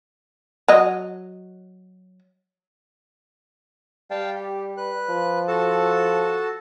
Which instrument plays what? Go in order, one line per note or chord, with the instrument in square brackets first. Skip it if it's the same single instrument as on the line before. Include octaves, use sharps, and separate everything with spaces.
[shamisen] F#3 D#5
[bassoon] G3 [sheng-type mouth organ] F5 G5 A5
[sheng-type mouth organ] G4
B4 F#6
[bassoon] F3
[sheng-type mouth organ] F#4 A4 A5